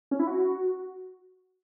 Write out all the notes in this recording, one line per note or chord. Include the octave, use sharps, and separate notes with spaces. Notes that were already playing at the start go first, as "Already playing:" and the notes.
C#4
E4
F#4